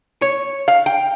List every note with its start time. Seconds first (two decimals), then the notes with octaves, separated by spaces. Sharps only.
0.22 C#5
0.68 F5
0.86 G5